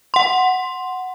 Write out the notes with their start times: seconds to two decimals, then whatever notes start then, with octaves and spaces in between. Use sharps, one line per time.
0.14 F#5 C6